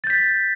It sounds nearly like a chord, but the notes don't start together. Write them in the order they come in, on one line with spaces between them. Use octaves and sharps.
A6 G6 B6